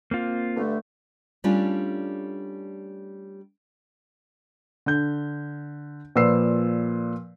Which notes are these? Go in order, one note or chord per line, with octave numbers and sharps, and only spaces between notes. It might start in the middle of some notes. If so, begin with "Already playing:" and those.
A#3 C4 F4
G2 D3 A3
G3 A3 C#4 D4 F4
D3 G6
A#2 F3 B4 D5 E6 C7